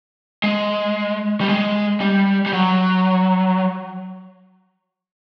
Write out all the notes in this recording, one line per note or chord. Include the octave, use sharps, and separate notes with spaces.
G#3
G3
G#3
G3
G3
F#3